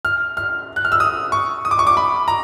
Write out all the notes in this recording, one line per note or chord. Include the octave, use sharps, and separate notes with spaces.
F6
F6
F#6
F6
E6
D#6
C#6
D#6
D6
C#6
D6
B5
A#5